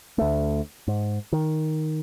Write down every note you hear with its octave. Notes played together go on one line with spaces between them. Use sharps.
D2 A3
G#2
D#3